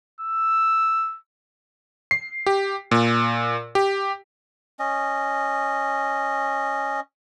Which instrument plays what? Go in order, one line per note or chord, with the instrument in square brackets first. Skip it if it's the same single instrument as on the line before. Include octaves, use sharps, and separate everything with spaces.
[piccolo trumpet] E6
[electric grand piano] C7
G4
A#2
G4
[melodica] C#4 D#5